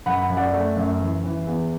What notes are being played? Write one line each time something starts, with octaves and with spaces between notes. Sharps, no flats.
F#2 F#5 B5
F#2
D5 F#5
A3
F#2
E3
E3
E2